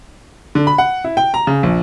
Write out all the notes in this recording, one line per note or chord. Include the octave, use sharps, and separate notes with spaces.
D3
B5
F#5
E4
G5
A#5
C#3
A#1